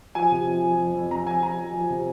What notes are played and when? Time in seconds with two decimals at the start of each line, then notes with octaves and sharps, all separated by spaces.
0.15 F3 G#5
0.32 C3
0.47 F3
0.63 F3
0.78 F2
0.94 F2
1.11 F2 A#5
1.26 F2 G#5
1.42 F3 A#5
1.57 F3
1.74 F3
1.90 C3